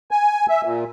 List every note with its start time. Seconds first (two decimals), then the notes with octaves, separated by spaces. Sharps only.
0.11 G#5
0.49 E5
0.65 A#2